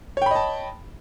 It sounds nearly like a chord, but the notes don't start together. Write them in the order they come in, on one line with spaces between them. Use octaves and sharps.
C#5 G5 B5 D#5 A5